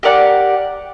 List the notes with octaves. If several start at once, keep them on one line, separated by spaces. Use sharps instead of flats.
G4 A#4 D5 F#5